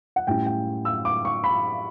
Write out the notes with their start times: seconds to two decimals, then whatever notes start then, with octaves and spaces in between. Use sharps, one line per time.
0.16 F#5
0.27 A2 G3 C#4 E4 G5
0.46 G5
0.85 E6
1.05 D6
1.25 C#6
1.44 B5